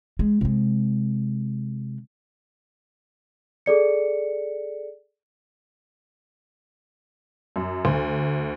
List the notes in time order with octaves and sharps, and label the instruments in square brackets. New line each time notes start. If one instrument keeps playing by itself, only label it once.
[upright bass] G#3
C3 G#3
[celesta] G#4 A4 D5 C#7
[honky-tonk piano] F#2
D2